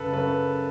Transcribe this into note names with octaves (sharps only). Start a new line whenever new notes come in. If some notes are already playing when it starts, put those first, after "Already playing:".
Already playing: F#2 C#3 A4 B4
F#2 B4